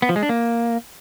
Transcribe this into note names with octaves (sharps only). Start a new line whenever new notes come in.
B3
F3
G#3
D4
A#3